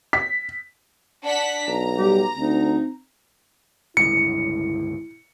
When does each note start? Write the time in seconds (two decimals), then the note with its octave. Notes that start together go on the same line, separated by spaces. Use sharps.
0.13 B6
1.23 D4 F#5 B6
1.68 B1 A#5
1.98 G3 G4
2.37 D2 C4 D#4
3.97 G1 C#2 A2 E4 C#7